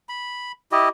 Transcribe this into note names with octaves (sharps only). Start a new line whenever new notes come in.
B5
E4 G4 D#5